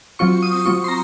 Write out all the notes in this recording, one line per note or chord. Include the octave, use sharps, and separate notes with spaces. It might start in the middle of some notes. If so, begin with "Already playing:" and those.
F#3 C4 F4 C#6
D#6
F#3 C4 F4 C#6
C6
A#5